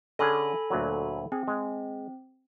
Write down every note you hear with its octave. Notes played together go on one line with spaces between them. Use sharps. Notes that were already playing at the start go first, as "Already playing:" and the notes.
D3 C#4 G#4 A4 G#5 B5
D2 A#2 F#3
C4 G#4
G#3